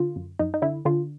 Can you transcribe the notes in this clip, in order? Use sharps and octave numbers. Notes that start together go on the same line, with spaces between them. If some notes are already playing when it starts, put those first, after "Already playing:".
Already playing: D3 F4
F#2
F#2 D#4
D#4
D3 E4
D3 F4